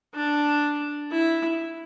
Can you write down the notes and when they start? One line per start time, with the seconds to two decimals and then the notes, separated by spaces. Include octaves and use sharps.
0.15 D4
1.11 E4